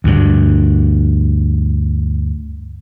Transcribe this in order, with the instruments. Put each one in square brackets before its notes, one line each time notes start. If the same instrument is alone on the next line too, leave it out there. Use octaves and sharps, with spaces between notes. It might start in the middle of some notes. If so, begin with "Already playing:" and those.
[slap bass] D2 G2